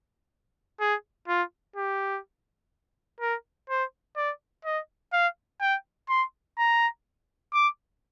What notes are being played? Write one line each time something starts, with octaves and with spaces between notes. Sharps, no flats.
G#4
F4
G4
A#4
C5
D5
D#5
F5
G5
C6
A#5
D6